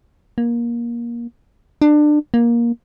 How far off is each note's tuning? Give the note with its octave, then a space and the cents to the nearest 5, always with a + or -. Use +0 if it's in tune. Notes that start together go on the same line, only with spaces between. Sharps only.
A#3 +20
D4 +25
A#3 +15